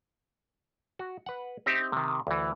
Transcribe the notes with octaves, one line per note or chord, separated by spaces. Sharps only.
F#4
B4 F#5
C4 D#4 G4 E5
C3 D#3
D2 E3